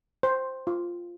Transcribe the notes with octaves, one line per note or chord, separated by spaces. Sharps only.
C5
F4